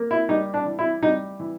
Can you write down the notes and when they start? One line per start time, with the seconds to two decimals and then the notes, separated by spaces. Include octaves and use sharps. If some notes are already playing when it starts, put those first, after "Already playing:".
Already playing: A#3
0.11 E4
0.29 G3 D#4
0.54 D4
0.66 E3
0.79 E4
1.02 G3 D#4
1.40 E3